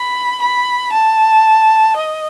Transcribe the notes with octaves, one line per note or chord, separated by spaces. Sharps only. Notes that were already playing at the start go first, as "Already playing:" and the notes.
Already playing: B5
B5
A5
D#5